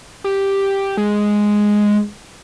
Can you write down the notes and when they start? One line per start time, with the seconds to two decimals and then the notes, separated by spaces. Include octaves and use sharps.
0.24 G4
0.97 G#3